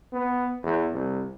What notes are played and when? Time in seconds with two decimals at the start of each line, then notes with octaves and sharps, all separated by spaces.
0.13 B3
0.63 E2
0.93 C2